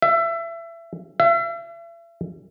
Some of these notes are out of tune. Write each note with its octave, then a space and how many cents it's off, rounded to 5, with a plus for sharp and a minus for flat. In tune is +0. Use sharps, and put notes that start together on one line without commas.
E5 +25
E5 +40